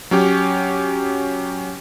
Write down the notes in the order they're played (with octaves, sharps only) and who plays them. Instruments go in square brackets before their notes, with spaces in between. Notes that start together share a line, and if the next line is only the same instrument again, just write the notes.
[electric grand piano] F#3 C#4 G4